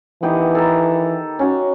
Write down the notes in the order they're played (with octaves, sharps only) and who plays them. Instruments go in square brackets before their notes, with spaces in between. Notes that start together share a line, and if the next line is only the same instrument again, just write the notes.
[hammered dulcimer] D#3 B3 G4 [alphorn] E3
[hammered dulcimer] A4 A#5
C#4 F#4 A#5